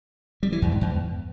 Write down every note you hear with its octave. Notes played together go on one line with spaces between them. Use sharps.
G3
E3
E2
G#2
E2